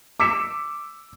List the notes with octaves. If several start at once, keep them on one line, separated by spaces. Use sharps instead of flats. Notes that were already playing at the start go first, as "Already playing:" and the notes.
D6 E6 B6 C#7 E7